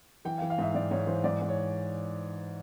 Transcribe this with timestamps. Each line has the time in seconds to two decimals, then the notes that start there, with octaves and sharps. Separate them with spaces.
0.25 E3 G5
0.38 F5
0.42 E3
0.50 F5
0.58 G#2 E5
0.75 G#2 D5
0.91 G#2 C#5
1.07 E3 C5
1.24 G#2 D5
1.41 G#2
1.49 C#5